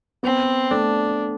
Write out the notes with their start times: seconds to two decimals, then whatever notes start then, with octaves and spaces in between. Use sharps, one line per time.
0.23 B3 C4
0.71 A3 D4